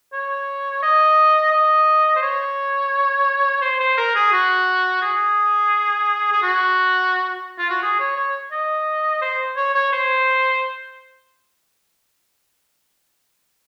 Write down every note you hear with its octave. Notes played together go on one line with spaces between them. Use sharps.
C#5
D#5
D#5
C5
C#5
C5
C5
A#4
G#4
F#4
G#4
G#4
F#4
F4
F#4
G#4
C#5
C#5
D#5
C5
C#5
C#5
C5